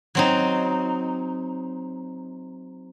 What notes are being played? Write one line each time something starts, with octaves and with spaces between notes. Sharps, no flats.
F#3 C4 D#4